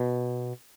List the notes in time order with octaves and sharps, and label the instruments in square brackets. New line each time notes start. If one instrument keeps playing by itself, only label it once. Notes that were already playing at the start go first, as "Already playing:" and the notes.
Already playing: [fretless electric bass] B2